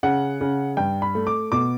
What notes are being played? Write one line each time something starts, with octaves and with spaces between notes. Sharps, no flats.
C#3 F#5
C#3
G2 G5
B5
A3
D6
B2 D6